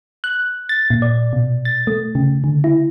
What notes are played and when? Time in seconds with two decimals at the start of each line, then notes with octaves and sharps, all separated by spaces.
0.24 F#6
0.69 A6
0.90 A#2
1.02 D5
1.33 B2
1.65 A6
1.87 A3
2.15 C#3
2.44 D3
2.64 E4